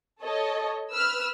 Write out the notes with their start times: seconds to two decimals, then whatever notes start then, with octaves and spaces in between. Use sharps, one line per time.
0.22 A4 C#5 D#5
0.92 B4 E6 F6